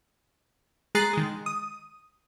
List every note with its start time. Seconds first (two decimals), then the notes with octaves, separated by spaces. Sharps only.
0.95 G#3 G#4 A#5 F#6 A6 C7
1.13 D#3 G#3
1.46 D#6